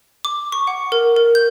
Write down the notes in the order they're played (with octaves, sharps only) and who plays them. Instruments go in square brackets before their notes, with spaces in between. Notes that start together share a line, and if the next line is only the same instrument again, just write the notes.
[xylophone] D6
C#6
F#5
A#4
A#4
G6